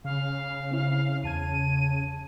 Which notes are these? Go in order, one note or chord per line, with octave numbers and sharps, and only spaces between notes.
C#3 F5
C4 E4
E2 A5 G#6 D#7